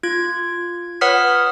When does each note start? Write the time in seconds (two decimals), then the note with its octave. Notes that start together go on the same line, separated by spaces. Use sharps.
0.03 F4 G#6
1.01 B4 C#5 F#5 D#6 F6 B6